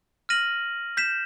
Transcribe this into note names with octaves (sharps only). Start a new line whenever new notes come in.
F6 A#6 D#7 F#7
G6 B6 E7